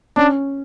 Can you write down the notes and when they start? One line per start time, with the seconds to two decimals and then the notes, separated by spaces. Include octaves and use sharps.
0.16 C#4 D4